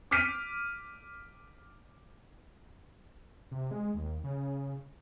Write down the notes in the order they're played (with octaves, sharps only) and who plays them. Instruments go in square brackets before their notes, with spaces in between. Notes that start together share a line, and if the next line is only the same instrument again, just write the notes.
[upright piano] D6 F6 G6 B6 D7 D#7
[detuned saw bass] C3
G#3
D#2
C#3